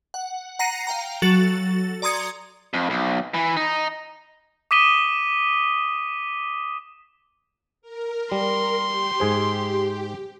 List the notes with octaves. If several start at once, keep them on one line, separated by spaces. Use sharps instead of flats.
F#5
F#5 A#5 A#6 C7 C#7 D#7
F5 G5 A#5
F#3 F#4 A4 A6
D5 A#5 C6 D#6 G#6 C#7
F2
B1
E3
D#4
D6 D#6 B6 D#7 E7 G7
A#4
G3 C6
G4
G#2 G#4 C5